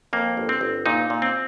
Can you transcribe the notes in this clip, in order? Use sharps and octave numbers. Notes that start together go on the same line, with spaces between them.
F2 A#3
G1
C4
G1
A#2 D#4
A#2
C4